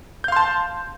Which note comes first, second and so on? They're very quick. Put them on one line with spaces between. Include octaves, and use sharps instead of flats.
G6 F5 C6 A5